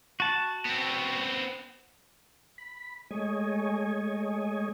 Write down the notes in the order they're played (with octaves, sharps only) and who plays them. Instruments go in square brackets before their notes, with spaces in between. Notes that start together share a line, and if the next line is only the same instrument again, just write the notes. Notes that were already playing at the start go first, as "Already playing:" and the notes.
[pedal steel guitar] F#4 A5
[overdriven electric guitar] B3 C4
[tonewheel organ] B5
G#3 A3 C#5 D#5 G#5